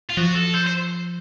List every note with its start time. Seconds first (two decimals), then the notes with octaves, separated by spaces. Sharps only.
0.10 F4
0.17 F3 F#4
0.35 A4
0.54 C5
0.66 C5